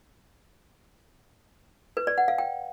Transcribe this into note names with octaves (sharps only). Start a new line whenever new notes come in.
B4
D5
F#5
F5
G5